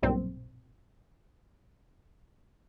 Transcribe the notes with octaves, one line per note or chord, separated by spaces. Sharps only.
B1 G2 A#2 C4